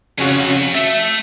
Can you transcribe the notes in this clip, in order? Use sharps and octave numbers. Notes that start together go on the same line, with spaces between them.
F2 C#3 C#4 F#4
A3 E5